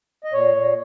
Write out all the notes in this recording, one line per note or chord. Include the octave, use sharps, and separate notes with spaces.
D#5
A#2 C#5
A#2